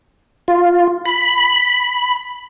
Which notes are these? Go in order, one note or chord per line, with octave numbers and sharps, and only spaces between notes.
F4
B5